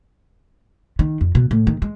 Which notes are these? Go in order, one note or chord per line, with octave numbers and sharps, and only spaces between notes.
D#3
F2
B2
A2
D#3
G#3